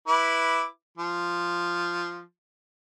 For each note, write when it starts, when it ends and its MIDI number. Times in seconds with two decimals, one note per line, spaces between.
0.08 0.65 64
0.08 0.65 71
0.08 0.65 86
0.98 2.21 53